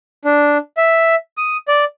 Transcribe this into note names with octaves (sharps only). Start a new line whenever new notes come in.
D4
E5
D#6
D5